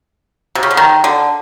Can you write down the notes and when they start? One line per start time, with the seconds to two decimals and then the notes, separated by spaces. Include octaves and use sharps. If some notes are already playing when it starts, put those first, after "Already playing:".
0.55 C3
0.63 C#3
0.71 D3
0.77 D#3
1.04 D3